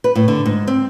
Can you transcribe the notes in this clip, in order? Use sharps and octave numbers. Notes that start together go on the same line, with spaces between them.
B4
A2
D3
G#2
C4